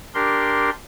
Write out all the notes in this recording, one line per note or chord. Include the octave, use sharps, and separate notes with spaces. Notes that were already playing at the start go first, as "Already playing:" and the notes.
D4 G4 A#4 C6